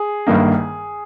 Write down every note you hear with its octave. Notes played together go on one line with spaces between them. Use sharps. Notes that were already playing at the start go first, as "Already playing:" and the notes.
Already playing: G#4
G1 G2 D#3 A#3 D#4